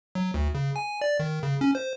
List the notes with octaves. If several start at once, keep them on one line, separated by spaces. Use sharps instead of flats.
F#3
D2
C#3
G#5
D5
D#3
C#3
C#4
C5